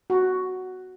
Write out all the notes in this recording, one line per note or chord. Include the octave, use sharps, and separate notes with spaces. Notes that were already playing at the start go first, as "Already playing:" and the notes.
F#4